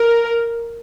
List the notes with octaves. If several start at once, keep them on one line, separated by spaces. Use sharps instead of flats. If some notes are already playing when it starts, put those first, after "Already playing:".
Already playing: A#4